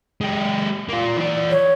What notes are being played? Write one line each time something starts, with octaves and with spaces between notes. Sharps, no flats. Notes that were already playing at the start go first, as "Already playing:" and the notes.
G#3 G4
A#3 F4
E3 D5
C#5